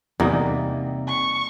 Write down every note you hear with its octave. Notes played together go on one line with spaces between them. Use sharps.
E2 C3 G3 A#3 D#4
C#6